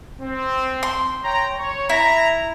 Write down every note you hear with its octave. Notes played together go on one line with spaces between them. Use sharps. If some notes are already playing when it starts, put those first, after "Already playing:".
C4
C6
C#5 G5 A#5
C#5
E4 A#5